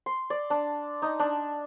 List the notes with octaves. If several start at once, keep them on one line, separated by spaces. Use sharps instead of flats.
C6
D5
D4
D#4
D4